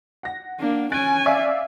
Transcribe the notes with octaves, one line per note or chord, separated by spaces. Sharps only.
F#5 A#6
A#3 D4
C#4 G#5 F#6 A6 D7
D5 E5 F5